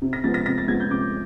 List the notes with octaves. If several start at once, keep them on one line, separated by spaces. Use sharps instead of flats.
C3
A#6
F3 G#3 B3 A6
A#6
C3 A#6
A6
F3 G#3 B3 G#6
G6
C3 D6